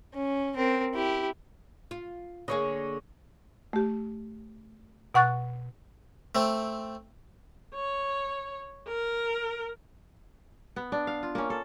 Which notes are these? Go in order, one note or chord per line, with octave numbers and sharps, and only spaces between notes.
C#4
C4 A#4
E4 G4
F4
D3 A#3 G#4 C#5 D#5
A3 G4
B2 F#5 C#6 F#6 A6
A3 C4
C#5
A#4
B3
D4
F5
F4
A#3 C#4
A4